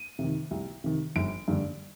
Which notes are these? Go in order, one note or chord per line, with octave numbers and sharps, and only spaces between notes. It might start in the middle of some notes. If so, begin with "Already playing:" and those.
Already playing: D#7
C3 D#3
C2
C3 D#3
G1 D7
G2 D3